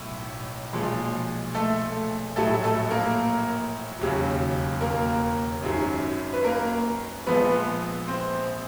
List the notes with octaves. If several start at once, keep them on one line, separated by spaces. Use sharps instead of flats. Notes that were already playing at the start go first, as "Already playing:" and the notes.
Already playing: B1 A2
B1 A#2 F3 G#3
A3 A4
A#1 A2 F#3 A3 A4
A3 A4
A#3 A#4
E1 D#2 C#3 F#3
A#3 A#4
G#1 F#2 D#3 F#3
B4
A#3 A#4
A#1 A#2 F3 G#3 B3 B4
C4 C5